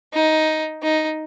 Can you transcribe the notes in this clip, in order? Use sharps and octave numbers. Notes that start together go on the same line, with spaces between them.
D#4
D#4